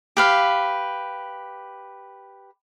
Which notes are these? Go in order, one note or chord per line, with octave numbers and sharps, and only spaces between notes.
G4 B4 F5